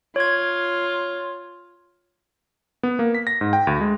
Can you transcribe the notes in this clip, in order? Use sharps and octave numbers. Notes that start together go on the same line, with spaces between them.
F4 C#5 G#6
B3
A#3
B6
A#6
G#2
G5
D2
G#3